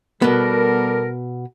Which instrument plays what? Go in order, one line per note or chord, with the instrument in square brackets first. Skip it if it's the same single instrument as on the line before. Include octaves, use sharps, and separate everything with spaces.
[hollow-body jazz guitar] B2 B3 [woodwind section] G3 A4 A#4